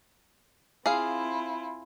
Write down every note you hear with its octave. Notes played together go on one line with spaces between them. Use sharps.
C4 E4 F4 G#4 F5